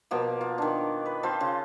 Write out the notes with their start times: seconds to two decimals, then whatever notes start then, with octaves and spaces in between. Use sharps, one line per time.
0.11 B2 F3 A#3
0.41 F4
0.58 D#3 D4
1.06 B4
1.23 C4 F4 A4 C5
1.41 C#3